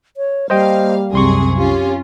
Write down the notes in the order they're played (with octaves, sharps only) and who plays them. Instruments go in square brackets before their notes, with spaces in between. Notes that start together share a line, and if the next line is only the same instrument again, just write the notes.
[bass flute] C#5
[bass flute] G3 [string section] A#3 F5 [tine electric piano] C5 D#5 G5
[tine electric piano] C2 C6 C#6 [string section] F#2 C3 G#4
[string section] C#4 F4 [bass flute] G4